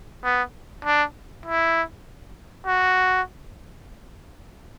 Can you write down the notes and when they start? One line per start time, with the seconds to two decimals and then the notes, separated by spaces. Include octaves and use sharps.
0.24 B3
0.85 D4
1.46 E4
2.67 F#4